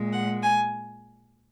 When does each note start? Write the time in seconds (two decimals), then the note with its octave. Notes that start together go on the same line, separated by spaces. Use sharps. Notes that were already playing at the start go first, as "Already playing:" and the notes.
Already playing: A#2 G#3
0.12 F#5
0.43 G#5